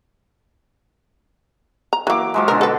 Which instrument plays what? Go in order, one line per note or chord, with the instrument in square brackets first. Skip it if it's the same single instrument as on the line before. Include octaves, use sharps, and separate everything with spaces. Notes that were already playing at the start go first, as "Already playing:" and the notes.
[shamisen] A#5
[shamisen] E3 A#3 [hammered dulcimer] F#3 D6
[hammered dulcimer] F3 F#3 G#3
[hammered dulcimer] B2 D3 [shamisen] A#4
[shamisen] A4 B4